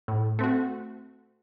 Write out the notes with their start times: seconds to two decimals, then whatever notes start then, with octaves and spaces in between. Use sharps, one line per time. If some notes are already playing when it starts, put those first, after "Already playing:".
0.08 A2
0.39 A3 C4 F#4